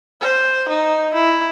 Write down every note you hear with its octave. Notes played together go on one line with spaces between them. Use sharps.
C5
D#4
E4